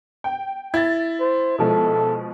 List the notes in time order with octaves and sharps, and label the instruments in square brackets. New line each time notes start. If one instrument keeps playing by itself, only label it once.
[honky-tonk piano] G5
[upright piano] E4 [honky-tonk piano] G#6 A6
[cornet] C5
[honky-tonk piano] B2 F3 G#3 [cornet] A4